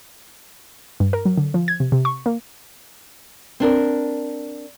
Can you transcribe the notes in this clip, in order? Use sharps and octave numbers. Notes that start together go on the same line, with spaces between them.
G2
A#4
F#3
D3
F3
G#6
C3
C3
C#6
A#3
C4 D4 A#4